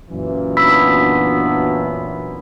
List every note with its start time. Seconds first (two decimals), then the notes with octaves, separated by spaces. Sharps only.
0.10 F#2 A#2 E3
0.57 F#3 B3 D4 B5 E6 B6